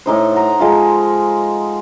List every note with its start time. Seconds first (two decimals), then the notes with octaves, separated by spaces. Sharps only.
0.06 A2 D#4 C5
0.32 F#5 A#5
0.59 F3 G#3 D#4 F4